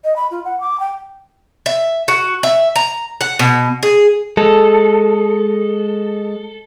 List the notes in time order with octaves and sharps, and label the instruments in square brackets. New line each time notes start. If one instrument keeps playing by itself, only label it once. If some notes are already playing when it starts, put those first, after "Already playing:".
[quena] D#5
B5
F4
F#5
D6
G5
[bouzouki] E5
F#4
E5
A#5
F#5
B2
G#4
[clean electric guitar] G#3 [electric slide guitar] A4